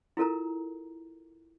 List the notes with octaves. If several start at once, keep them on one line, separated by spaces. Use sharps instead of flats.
E4 F4 A4 A#4 A#5